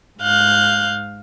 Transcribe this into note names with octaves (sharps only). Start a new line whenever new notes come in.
G#2 F5 F#6 G6